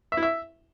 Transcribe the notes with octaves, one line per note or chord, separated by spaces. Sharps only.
E5
E4
E5